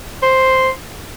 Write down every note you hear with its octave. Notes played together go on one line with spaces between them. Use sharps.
C5